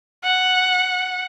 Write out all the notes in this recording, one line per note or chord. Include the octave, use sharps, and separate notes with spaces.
F#5